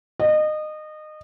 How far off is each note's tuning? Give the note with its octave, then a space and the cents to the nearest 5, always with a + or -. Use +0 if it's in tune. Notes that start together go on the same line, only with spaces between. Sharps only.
D#5 -25